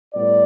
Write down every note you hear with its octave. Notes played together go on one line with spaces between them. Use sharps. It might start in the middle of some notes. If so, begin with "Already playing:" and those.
A2 G3 B3 D5